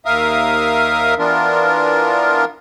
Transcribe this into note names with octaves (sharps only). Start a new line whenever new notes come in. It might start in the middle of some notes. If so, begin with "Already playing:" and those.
D#2 A#4 E5 F5 D#6
E3 B3 D4 F4 A#4